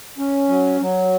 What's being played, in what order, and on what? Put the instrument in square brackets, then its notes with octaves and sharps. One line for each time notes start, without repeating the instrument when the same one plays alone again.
[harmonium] C#4
F#3
F#3